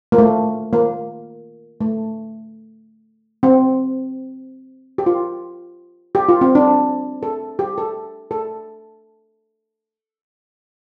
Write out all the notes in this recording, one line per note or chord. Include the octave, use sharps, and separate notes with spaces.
A#3
A3
A#3
A3
C4
G4
F4
G4
F4
C4
D4
A4
G4
A4
A4